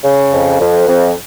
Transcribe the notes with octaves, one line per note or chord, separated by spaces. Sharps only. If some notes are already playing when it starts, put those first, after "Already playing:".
C#3
F2
F2
F2